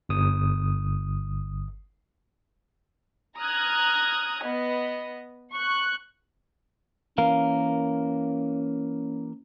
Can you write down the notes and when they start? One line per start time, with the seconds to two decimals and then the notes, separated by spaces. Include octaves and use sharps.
0.09 G1 D#6
3.38 A#5 D#6 F6 F#6 G#6
4.43 B3 D#5
5.52 C#6 F#6
7.18 E3 A#3 C#4 A#4 F5